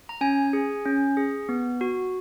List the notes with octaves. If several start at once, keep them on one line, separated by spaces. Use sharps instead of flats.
A#5
C#4 G#5
G#4
C#4
G#4
B3
F#4